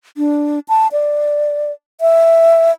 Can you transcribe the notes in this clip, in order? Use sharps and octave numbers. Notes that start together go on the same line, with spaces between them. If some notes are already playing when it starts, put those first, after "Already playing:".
D4
A5
D5
E5